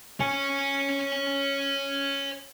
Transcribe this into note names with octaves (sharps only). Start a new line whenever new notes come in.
C#5 G#5